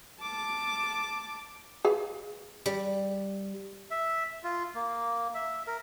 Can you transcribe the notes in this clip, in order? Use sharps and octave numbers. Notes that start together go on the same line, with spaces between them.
A5 D6
G#4 B4 F5
G3
E5
F4
A#3
E5
A#4